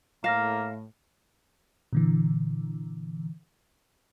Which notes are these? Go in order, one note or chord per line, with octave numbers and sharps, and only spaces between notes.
A2 A#3 F5 F6 A#6 E7
A#2 D3 E3